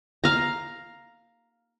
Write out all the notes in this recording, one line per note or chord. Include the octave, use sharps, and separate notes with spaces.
F5 A#5